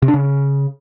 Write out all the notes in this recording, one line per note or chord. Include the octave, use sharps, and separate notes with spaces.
C3
D4
C#3